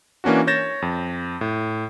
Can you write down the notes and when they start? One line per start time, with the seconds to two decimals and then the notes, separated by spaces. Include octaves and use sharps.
0.24 E3 A#3 C#4 D4 F#4
0.47 C#5 G6 A6 A#6 E7
0.82 F2
1.41 A2